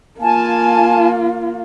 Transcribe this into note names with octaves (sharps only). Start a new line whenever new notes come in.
A#3 F4 G#5 A5